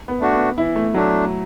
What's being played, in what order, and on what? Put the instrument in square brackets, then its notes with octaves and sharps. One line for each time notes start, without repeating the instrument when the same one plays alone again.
[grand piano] B3
[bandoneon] A3 D4 F#4
[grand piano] B3
[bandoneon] E3 [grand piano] E4
[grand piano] A3
[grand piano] F#3 [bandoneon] A3 D4